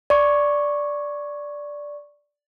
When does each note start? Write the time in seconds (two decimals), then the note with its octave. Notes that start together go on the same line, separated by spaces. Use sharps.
0.10 D5 C#6